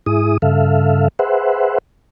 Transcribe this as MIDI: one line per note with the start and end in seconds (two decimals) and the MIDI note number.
0.06 0.38 44
0.06 0.38 64
0.06 0.38 68
0.06 0.38 87
0.42 1.08 43
0.42 1.08 49
0.42 1.08 69
0.42 1.08 76
0.42 1.08 77
1.19 1.78 68
1.19 1.78 71
1.19 1.78 72
1.19 1.78 76
1.19 1.78 78